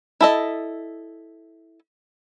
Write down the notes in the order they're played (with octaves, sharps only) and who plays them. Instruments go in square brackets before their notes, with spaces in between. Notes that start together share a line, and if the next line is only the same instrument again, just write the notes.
[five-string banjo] E4 A4 D#5